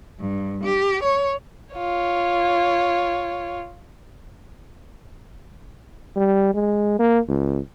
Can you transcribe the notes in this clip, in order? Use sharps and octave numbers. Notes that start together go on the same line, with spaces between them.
G2
G4
C#5
F4 C#5
G3
G#3
A#3
C#2